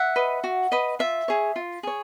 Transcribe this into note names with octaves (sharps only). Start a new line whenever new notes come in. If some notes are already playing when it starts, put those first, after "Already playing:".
Already playing: E5 F#5
B4 D#5
F#4
B4 D#5
F4 E5
G#4 C#5
F4
G#4 C#5